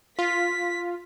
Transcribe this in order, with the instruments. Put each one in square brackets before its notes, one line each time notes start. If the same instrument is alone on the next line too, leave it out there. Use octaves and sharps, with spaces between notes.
[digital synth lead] F4 [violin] B6